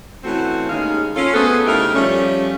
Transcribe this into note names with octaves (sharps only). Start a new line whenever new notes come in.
E3 A3 C4 C#4 F#4
D#2 D#3 G#3 C#4 G#4 F5
C#4 F4 A4
A3 B3 F#4 G#4 A4 C5
C#3 A3 D#4 E4 G4 A#4
F3 G3 A3 C#4